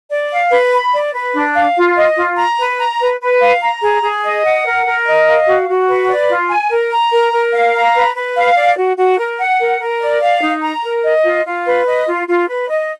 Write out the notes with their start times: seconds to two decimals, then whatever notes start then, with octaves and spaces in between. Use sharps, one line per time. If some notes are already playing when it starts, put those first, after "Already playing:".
0.11 D5
0.32 F5
0.52 B4
0.73 B5
0.93 D5
1.14 B4
1.35 D4
1.56 F5
1.76 F4
1.96 D#5
2.17 F4
2.38 A#5
2.58 B4
2.79 A#5
3.00 B4
3.21 B4
3.41 F5
3.61 A#5
3.82 G#4
4.03 G#4
4.23 D#5
4.44 F#5
4.65 A#4
4.86 A#4
5.06 D#5
5.27 F5
5.47 F#4
5.68 F#4
5.89 B4
6.09 D5
6.30 F4
6.50 G#5
6.71 A#4
6.92 A#5
7.12 A#4
7.33 A#4
7.54 F5
7.74 A#5
7.95 B4
8.15 B4
8.36 F5
8.56 D5
8.77 F#4
8.98 F#4
9.19 A#4
9.39 F#5
9.60 A#4
9.80 A#4
10.01 D5
10.22 F5
10.42 D#4
10.63 A#5
10.83 A#4
11.04 D#5
11.24 F4
11.45 F4
11.66 B4
11.86 D#5
12.07 F4
12.28 F4
12.48 B4
12.69 D#5